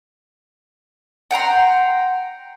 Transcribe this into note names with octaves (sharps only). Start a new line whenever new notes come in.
F#5 G5 A#5 C6